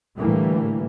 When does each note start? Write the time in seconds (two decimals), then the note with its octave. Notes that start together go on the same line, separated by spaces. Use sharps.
0.17 A2 D3 E3 G3 A3 A#3